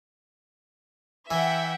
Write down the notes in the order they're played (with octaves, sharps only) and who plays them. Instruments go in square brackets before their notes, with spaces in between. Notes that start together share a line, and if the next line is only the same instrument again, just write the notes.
[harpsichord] E3 [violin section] E5 F#5 G5